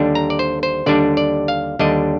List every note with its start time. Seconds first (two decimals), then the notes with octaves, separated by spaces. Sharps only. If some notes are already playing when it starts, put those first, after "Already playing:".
Already playing: D#2 D3 G3 D4
0.15 A#5
0.30 D5
0.39 C5
0.63 C5
0.86 D#2 D3 G3 D4 D5
1.17 D5
1.48 F5
1.79 D#2 D3 G3 D4 D#5